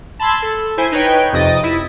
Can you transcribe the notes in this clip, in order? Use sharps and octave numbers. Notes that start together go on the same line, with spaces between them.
A5 B5 C6 E6 G#6
A4
E4 C5 G#5
D#4 B4 C#5 G5
F2 C3 D#5 D#6 A6
E4